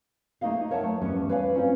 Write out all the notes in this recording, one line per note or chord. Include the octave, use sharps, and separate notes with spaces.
A3 A#3 D#4 G#4 D#5 F5
A#4 C#5 E5 F#5 A5
A3
E2 G2 G3 B3 C#4
B4 C#5 D5 F5 G#5
C4 C#4 D#4 F4 C5